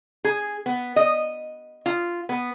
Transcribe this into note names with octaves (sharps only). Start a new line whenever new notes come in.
G#4
B3
D#5
F4
B3